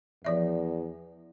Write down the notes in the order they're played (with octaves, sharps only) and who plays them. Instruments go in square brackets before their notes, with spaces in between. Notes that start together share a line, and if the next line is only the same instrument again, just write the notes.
[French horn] E2 [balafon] F3 D5 E5